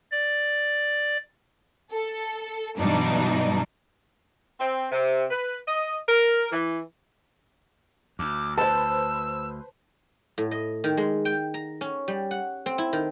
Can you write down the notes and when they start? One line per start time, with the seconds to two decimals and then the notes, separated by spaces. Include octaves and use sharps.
0.11 D5
1.92 A4
2.77 G2 B2 E3 F#3 D4 D#4
4.60 C4
4.92 C3
5.31 B4
5.67 D#5
6.09 A#4
6.52 E3
8.19 D2 D6
8.57 B4 C5 A5 E6
10.38 A2
10.51 D#5
10.84 D#3
10.97 G#3
11.25 G5
11.54 A#5
11.81 C#4
12.08 G3
12.31 F#5
12.66 C4
12.78 E4
12.93 D#3